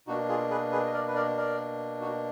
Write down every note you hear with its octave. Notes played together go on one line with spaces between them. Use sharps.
B2 A#3 D4 D#4 F#4
F4 G#4
G#4 B4
G#4 B4
D#5
A#4 D5
B4
A#4 D5
A#4 D5
D#4 F#4